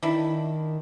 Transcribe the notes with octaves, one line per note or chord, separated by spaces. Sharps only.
D#3 D4 E4